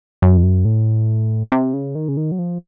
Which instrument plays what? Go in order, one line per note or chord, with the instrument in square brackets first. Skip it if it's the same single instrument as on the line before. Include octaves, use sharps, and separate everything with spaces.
[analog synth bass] F#2
F2
F#2
A2
C3
C#3
D#3
C#3
D#3
F#3
F3